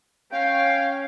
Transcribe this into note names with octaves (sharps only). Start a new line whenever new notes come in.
C#4 F5 G5